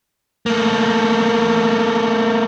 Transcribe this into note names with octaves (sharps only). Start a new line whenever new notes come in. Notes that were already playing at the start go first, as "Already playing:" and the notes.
A3 A#3